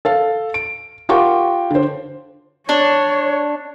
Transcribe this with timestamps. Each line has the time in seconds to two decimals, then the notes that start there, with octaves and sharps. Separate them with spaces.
0.05 A4 F5
0.54 D7
1.09 F4 G4 A#4 F#5 G5 C#6
1.71 D3 C5
2.69 D4 C#5